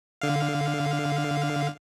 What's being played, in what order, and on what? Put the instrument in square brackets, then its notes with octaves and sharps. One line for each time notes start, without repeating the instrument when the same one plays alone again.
[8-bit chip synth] D3 F5